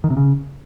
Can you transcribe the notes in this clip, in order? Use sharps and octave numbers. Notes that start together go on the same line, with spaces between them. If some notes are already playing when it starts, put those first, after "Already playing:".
D#3
C3
C#3